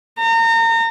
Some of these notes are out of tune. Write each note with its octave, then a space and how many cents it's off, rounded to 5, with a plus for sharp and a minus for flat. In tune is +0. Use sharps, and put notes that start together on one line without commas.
A#5 -30